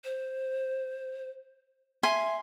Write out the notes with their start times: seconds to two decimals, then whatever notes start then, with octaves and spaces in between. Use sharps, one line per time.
0.04 C5
2.03 E5 G#5 C6